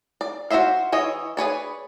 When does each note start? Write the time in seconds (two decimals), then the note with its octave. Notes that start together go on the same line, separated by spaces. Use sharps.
0.21 D5
0.50 F#4 G#4 C5 E5 F5
0.92 E3 C#5 D#5
1.37 G#4 B4 C#5 D5